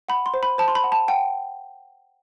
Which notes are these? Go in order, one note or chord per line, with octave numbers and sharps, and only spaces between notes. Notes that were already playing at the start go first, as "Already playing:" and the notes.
F#5 B5
C6
C5
B5
C5 A5
C6
B5
F#5
A5
F#5 G5